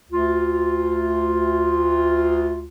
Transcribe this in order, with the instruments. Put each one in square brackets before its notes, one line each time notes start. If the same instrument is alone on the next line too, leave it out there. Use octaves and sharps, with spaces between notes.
[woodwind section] D2 F4